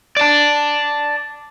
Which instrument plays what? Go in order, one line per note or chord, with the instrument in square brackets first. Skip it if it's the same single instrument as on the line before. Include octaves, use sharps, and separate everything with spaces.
[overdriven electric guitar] D5 A5